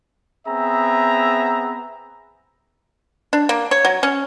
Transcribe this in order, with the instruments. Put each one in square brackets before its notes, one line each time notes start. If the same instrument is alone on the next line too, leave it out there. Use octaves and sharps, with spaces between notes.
[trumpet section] B3 C4 G#4 E5 A#5
[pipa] D4
A#3
C#5
F#3
C#4